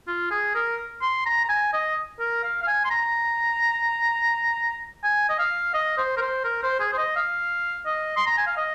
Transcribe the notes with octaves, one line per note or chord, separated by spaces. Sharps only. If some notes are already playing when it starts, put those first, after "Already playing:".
F4
G#4
A#4
C6
A#5
A#5
G#5
D#5
A#4
F5
F5
G#5
C6
A#5
G#5
D#5
F5
D#5
C5
A#4
C5
A#4
C5
G#4
C5
D#5
F5
D#5
C6
A#5
G#5
F5
D#5